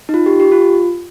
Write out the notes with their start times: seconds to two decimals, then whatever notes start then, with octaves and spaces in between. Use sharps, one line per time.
0.09 D#4
0.14 F4
0.26 G4
0.40 G4
0.52 F4